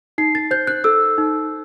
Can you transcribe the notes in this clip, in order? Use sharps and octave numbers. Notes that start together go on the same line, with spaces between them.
D#4 C7
A6
C5 G6
F#6
A4 E6
D#4